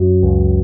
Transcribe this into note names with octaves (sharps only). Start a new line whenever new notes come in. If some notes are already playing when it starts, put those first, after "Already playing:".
Already playing: F#2 F#3
C#2